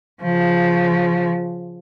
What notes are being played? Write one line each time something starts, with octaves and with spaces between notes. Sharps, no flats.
C#3 F3